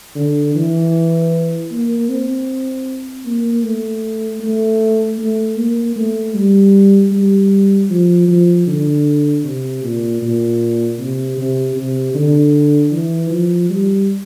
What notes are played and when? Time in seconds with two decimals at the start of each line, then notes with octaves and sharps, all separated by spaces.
0.15 D3
0.55 E3
1.71 A#3
2.09 C4
3.26 A#3
3.63 A3
4.41 A3
5.18 A3
5.57 A#3
5.96 A3
6.34 G3
7.11 G3
7.90 F3
8.28 F3
8.67 D3
9.44 C3
9.83 A#2
10.22 A#2
10.99 C3
11.37 C3
11.76 C3
12.14 D3
12.92 E3
13.30 F3
13.70 G3